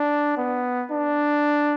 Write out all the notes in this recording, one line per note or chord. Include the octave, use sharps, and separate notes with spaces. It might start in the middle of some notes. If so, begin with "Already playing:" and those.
Already playing: D4
B3
D4